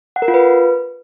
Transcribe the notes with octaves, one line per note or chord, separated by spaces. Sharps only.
F#5
A#4
F4
B4